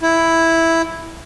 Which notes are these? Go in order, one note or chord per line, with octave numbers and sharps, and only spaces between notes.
E4